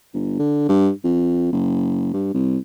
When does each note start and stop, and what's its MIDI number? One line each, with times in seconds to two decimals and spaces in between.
0.14 0.37 31
0.39 0.67 50
0.68 0.90 43
1.04 1.47 41
1.52 2.12 30
2.14 2.31 43
2.34 2.57 36